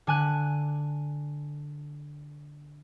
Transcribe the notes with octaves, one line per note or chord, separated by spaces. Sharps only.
D3 G#5 F#6